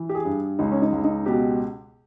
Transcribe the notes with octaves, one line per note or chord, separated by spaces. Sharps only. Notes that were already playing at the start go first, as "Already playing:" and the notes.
Already playing: E3
G4
G#4
G2
C#2 D#4
C#4
D#4
C#2
D#4
B2 G4